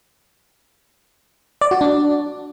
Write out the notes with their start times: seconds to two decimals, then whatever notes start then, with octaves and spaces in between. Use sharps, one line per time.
1.61 D5
1.71 F#4
1.81 D4